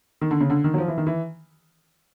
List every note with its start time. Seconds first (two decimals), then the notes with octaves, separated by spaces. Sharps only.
0.21 D#3
0.31 D3
0.41 C#3
0.50 D3
0.64 D#3
0.74 F#3
0.78 F3
0.88 E3
0.98 D#3
1.07 E3